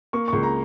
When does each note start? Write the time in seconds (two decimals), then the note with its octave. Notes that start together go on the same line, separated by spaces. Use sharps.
0.13 A#3 C#6
0.28 C#2 C#6
0.43 A#5